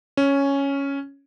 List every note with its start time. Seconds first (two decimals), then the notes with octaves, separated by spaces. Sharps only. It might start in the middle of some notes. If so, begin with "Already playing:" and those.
0.17 C#4